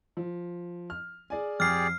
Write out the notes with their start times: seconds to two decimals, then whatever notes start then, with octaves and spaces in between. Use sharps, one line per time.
0.17 F3
0.90 F6
1.30 G#4 D5 G#5
1.60 F2 G4 G#4 D5 F6 C7